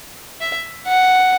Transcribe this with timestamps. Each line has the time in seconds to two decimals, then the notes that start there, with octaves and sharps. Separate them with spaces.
0.41 E5
0.87 F#5